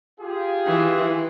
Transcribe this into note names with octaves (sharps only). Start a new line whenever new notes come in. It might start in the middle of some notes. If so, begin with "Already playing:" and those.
F4 G4 G#4
E3